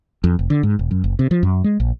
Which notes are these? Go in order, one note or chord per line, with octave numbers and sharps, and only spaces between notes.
F2
F1
D3
G#2
E1
F#2
F#1
C3
F3
F#2
G#3
A#1